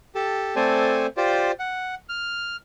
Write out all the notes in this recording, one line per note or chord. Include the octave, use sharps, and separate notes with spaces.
G4 A4 A5
A3 C4 A4 C5 D5 G#5
F4 G4 C5 D5
F#5
F6